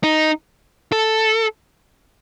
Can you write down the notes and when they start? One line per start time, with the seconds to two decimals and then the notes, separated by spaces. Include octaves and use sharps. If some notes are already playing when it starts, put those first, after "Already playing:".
0.03 D#4
0.92 A4